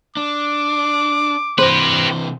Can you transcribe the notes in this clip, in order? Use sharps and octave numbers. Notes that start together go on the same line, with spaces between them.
D4 D6
C3 E3 G4 B4 C5